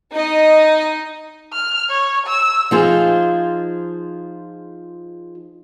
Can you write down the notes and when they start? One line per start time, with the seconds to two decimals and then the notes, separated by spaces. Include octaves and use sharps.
0.13 D#4 D#5
1.53 F6
1.89 C#5
2.27 E6
2.71 F3 D#4 F4 G#4 C5